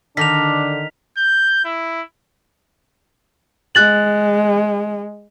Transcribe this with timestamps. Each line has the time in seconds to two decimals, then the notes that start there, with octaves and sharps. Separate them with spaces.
0.17 D3 D#3 D4 B6 F7
1.18 G6
1.65 E4
3.75 G#3 F#6 A6 F#7